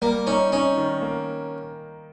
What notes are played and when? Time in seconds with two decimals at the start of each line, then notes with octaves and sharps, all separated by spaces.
0.02 G3 A#3
0.27 C#4 D#4
0.52 C#4 D#4
0.78 D#3
1.02 A#3